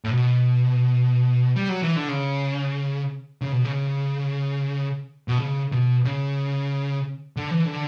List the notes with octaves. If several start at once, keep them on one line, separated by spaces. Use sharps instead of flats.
A2
B2
G3
F#3
E3
D3
C#3
C#3
B2
C#3
B2
C#3
B2
C#3
D3
E3
D3